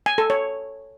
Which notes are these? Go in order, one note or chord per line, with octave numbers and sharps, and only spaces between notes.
G#5
A4
C#5